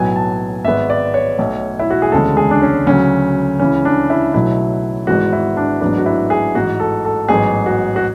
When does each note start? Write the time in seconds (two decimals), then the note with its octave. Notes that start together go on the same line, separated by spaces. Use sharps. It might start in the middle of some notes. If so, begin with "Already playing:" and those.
Already playing: B1 A2 F#3 B3 G#5
0.16 A5
0.65 G#1 G#2 G#3 B3 E5
0.90 D5
1.14 C#5
1.39 B1 B2 A3
1.79 E4
1.90 F#4
2.02 G#4
2.12 E1 D2 C#3 G#3 A4
2.37 G#4
2.51 D4
2.62 C#4
2.87 D2 C#3 F#3 C#4
3.59 C#2 C#3 E3 C#4
3.85 D4
4.10 E4
4.34 B1 B2 F#3 A3 E4
5.07 G#1 G#2 E3 G#3 B3 F#4
5.33 E4
5.57 D4
5.81 A1 G#2 F#3 B3 D4
5.98 F#4
6.06 E4
6.30 G#4
6.55 A1 G#2 E3 F#4
6.80 A4
7.05 A4
7.28 A1 G#2 F#3 B3 G#4
7.66 F#4
7.96 F#4